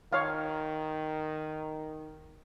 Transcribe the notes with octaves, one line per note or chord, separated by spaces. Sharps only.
D#3 C#5 F5